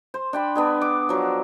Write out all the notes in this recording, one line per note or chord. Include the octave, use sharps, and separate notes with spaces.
C5
D4 G5 B5
B3 D4 G#4
D6
F3 F#3